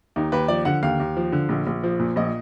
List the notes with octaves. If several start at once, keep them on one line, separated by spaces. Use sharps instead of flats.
D#2 D#4
D#2 B4
F3 D5
D3 F#5
D#2 F5
D#2
F3
D3
A#1
A#1
F3
A#2
A#1 D#5